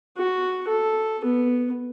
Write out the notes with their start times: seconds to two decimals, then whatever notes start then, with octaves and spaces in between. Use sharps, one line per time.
0.17 F#4
0.68 A4
1.25 B3